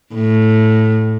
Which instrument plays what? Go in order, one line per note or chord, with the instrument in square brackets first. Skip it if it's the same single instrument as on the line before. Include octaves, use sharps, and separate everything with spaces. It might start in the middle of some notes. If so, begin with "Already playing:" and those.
[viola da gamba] A2